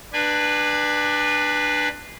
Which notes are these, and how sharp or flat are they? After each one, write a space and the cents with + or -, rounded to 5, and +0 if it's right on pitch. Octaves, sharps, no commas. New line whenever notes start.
D4 +20 B4 -10 G#5 -25